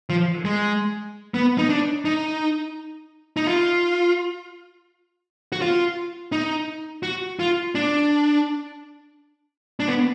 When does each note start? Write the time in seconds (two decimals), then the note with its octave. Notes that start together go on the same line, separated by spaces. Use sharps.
0.10 F3
0.45 G#3
1.34 B3
1.58 D#4
1.69 D4
2.05 D#4
3.37 D#4
3.47 F4
5.52 F#4
5.62 F4
6.32 D#4
7.03 F#4
7.40 F4
7.75 D4
9.80 D4
9.88 B3